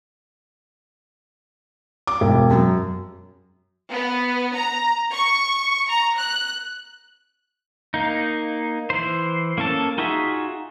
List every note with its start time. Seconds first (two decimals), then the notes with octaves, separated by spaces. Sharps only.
2.07 D6
2.21 E1
2.51 F#2
3.93 B3
4.56 A#5
5.13 C#6
5.89 A#5
6.18 F#6
7.94 A#3 D#4
8.90 E3 C5
9.58 A#3 C#4 A4 A5
9.98 D#4 F4 F#4 G#4 E5